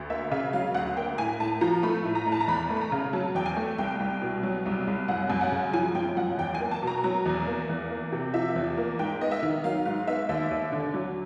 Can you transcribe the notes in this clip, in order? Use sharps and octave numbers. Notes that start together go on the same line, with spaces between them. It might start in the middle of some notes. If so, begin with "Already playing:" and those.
Already playing: D2
A#3 E5
C#3 E5
F#3 F5
D2 F#5
A#3 G5
A2 G#5
A2 A5
F3 A#5
A3 B5
A2
A#5
A2
A5
A#5
E2 B5
A3
B5
A#5
C#3
F#3 A5
E2 G5
G#5
A3
C2 G5
C2
B2
F#3
C2
C2
F#2 F#5
F#2
F#5
C#3
F3 G#5
F#2 G5
F#2 F#5
E2 G5
G#5
A#3
A5
B2
A#5
F#3 A#5
E2
A#3
E2
A#3
C3
F3 E5
E2
A#3
G#2 G5
B3 D#5
E5
D#3
F#3 F5
G#2 F5
B3 E5
D#2 E5
D#2
D3
F#3